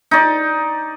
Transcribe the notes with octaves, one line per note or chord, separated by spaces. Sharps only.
D#4 D5